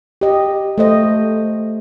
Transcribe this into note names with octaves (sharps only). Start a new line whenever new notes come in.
G4 D#5
A3 C5 D#5